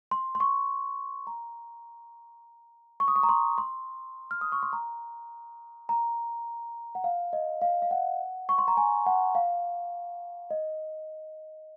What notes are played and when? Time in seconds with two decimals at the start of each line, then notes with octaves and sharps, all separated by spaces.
0.11 C6
0.35 C6
0.40 C#6
1.27 A#5
3.00 C#6
3.08 D#6
3.16 C#6
3.23 A#5
3.29 C6
3.58 C6
4.31 F6
4.41 D#6
4.52 C#6
4.63 C6
4.73 A#5
5.89 A#5
6.95 F#5
7.04 F5
7.33 D#5
7.61 F5
7.82 F5
7.91 F#5
8.49 C#6
8.58 C6
8.68 A#5
8.77 G#5
9.06 F#5
9.35 F5
10.51 D#5